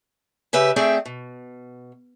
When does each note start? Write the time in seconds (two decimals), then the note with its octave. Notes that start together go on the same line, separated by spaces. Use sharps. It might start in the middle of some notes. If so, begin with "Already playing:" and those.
0.53 C#3 G4 B4 E5
0.76 A3 C4 G#4 D5 E5 G5
1.05 B2